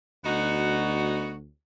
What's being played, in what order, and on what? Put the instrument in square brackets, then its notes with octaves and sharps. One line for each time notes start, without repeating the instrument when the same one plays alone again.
[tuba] D2 [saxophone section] B3 D#4 F#4